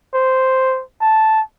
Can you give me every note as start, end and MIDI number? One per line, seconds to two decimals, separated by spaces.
0.14 0.83 72
1.01 1.41 81